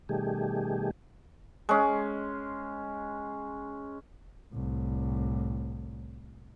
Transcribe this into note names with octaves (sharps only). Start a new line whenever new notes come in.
B2 D#3 G3 A3 G4 G#4
G#3 C#4
C2 A2